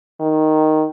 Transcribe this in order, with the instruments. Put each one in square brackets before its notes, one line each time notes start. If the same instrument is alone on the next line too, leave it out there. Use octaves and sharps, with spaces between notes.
[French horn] D#3